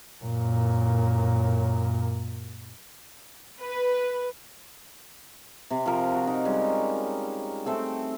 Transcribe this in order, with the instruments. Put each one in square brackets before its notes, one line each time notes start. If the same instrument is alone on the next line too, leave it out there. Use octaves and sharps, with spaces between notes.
[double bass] F#2 A#2
[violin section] B4
[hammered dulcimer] C3
F3 A#4
F#4
D#4
G3 G#3 C#4
A3 C4 A4 G5